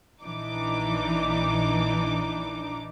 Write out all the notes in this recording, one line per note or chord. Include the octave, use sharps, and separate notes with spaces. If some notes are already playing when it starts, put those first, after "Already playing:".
A#1 E3 D4 D#4 D6